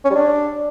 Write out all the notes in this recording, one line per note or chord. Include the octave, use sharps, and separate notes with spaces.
C#4
G3
D4